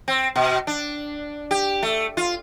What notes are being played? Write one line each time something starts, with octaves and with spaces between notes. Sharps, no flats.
C4
B2
D4
G4
A3
F4